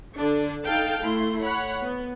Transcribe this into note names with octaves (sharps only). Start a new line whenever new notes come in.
D3 D4
D#4 A4 F5 G5 A5
A3 E4 C6
C#5 F#5 B5
B3